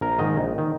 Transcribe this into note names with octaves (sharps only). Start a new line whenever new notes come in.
A#1 A#4
G#2 D#3 D#5
A#1
D#3